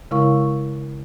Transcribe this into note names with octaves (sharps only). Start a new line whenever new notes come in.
C#3 G#3 E4 A#4 F5 C#6